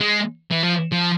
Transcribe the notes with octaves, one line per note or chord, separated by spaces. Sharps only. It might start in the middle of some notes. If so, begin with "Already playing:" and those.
G#3
E3
F3
F3